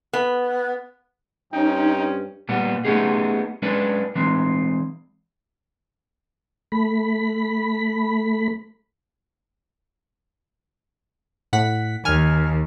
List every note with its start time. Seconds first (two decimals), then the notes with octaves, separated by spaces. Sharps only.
0.13 B3
1.53 G2 C4 C#4 D#4 G5
2.49 A#2 G3 B3
2.85 A3 B3 C#4 D#4 G4 G#4
3.62 G#3 C#4 D4 B4
4.16 E3 G#3 C4
6.72 A3 B5
11.53 A2 F#5 B6
12.05 D#2 G#5 F6